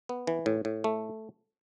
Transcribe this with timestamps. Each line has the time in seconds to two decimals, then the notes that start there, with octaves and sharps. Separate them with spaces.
0.09 B3
0.27 E3
0.46 A2
0.65 A2
0.84 A3